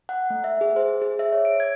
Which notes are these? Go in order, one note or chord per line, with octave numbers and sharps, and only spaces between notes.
F#5
A3
E5
G#4
C5
G#4
E5
C#5
D7
G#6